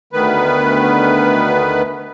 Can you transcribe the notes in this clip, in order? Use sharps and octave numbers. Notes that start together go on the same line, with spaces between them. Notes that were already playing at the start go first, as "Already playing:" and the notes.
D2 D#3 B3 B4